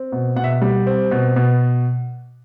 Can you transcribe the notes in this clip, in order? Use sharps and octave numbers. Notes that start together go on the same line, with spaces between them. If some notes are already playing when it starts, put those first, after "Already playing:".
Already playing: C4
B2
B2 F#5
E5
F#5
G3
C4
B2
B2